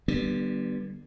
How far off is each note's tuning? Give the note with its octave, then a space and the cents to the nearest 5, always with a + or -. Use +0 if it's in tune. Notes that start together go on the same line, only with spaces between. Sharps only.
D3 +25 G3 -15 B3 -15